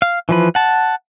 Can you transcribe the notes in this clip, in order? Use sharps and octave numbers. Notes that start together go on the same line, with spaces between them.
F5
E3 F3 B4
F#5 A5